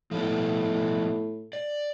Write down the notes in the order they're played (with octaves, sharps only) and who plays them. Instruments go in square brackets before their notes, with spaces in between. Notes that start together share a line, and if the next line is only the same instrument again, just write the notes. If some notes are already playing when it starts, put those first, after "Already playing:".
[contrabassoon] A2 [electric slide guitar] F3 G3 B3
[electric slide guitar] D5